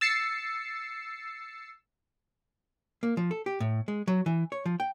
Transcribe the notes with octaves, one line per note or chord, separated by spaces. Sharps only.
E6 A6 C7 C#7
A#3
F3
A4
G4
A2
G#3
F#3
E3
C#5
F3
G5